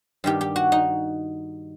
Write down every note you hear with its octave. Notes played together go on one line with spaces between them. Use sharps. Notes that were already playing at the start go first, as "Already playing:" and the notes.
G2 D#3 G4
G4
F#4
D#4